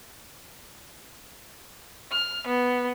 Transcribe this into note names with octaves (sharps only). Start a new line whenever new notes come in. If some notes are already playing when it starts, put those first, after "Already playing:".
F6
B3